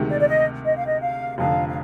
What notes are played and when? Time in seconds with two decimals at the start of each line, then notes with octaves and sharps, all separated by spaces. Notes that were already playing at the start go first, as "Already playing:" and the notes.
Already playing: D2 C3 D#3 G#3
0.09 D5
0.19 D5
0.28 D#5
0.64 D#5
0.76 F5
0.86 D#5
1.02 F5
1.38 F1 F2 D3 F5
1.68 F5